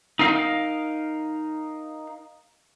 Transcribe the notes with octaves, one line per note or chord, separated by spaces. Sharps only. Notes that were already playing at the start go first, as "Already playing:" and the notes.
D#4 A#4 F5